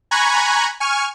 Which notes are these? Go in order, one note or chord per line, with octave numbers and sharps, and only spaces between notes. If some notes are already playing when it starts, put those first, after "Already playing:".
G#5 A#5 B5 C#6 F#6 G#6
G#5 C#6 F6